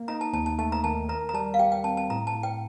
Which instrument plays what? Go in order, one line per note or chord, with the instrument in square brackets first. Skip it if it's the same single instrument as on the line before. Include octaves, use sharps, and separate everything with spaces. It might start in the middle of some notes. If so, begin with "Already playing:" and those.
Already playing: [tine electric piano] A#3
[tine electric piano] D#4 [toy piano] A#5
[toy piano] A5
[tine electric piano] D#2 [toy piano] A5
[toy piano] A5
[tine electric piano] A3 [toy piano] A5
[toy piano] A#5
[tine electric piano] D#3 [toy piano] A5
[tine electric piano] A#4 [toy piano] A#5
[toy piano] A#5
[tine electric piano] G3 [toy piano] A5
[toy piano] F5
[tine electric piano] G4 [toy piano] G5
[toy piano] G5
[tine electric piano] C4 [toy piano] A5
[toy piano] A5
[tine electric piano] A2 [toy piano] A#5
[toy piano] A5
[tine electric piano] A2
[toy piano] G5